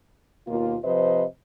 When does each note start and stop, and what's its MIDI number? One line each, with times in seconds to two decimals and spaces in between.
0.47 0.76 39
0.47 0.76 47
0.47 0.76 58
0.47 0.76 65
0.84 1.24 48
0.84 1.24 53
0.84 1.24 71
0.84 1.24 72
0.84 1.24 75